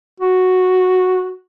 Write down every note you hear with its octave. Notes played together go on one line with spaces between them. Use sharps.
F#4